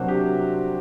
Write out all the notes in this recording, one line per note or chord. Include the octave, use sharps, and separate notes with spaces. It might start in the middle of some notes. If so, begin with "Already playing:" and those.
Already playing: C3 F#3 A#3 D4 F#4 C5
G4